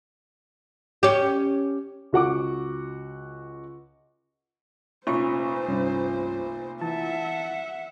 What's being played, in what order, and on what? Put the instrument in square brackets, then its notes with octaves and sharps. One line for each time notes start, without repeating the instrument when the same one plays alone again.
[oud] C#4 G4
[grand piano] C#2 F#4 F#5 D6
[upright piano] F1 A#2 C#6 [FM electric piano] C#4 [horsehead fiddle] C5
[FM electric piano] C2 G2 C#4
[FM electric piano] E3 A5 [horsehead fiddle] E5 F#5